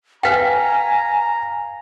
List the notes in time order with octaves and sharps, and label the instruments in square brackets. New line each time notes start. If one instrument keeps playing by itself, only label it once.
[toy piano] B4 G5 [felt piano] F5 B6 [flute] G#5 [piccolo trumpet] A#5